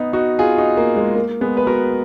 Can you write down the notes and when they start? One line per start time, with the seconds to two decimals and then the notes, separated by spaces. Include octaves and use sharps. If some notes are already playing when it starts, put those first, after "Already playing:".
Already playing: B3 D#4
0.13 D#4 F#4
0.39 F4 G#4
0.58 D#4 F#4
0.77 A#3
0.96 G#3
1.15 A#3
1.41 G#3 B3
1.57 B4
1.67 F#4 A#4